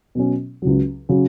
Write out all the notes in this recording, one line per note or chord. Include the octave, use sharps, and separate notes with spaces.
B2 F#3 C#4
C#2 C#3 F#3
C#3 F#3